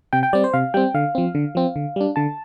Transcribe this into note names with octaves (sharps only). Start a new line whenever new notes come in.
C3 G5
G5
G3 C4 D5
C5
C3 F5
G3 C4 G5
D3 F5
F3 C4
D3
F3 C4
D3
G3 D4
D3 A5